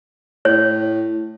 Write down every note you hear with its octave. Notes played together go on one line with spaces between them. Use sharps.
A2 C#5